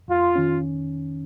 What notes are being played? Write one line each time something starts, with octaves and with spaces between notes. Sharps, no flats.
F2 F4
D#3 C#4